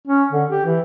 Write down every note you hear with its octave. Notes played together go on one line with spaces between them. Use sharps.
C#4
D3
G4
E3